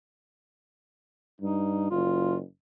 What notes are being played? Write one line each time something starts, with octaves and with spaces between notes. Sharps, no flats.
G2 D#4
F#1 F4